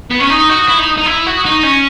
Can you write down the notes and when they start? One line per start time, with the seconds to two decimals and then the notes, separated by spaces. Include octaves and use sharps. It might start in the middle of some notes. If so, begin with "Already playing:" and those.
0.10 B3
0.19 C#4 C#6
0.30 D#4 D#6
0.50 F#4
0.68 E4
0.78 D#4
0.98 D#4
1.06 E4
1.26 F#4
1.37 D#6
1.45 D#4 C#6
1.63 C#4